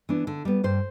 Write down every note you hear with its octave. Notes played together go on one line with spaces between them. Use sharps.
E3 B3 D4
D3
G3 B3
G2 C5